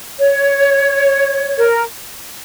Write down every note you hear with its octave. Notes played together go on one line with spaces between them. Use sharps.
C#5
A#4